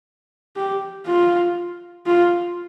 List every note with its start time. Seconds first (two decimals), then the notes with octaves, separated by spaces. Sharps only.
0.56 G4
1.07 F4
2.06 F4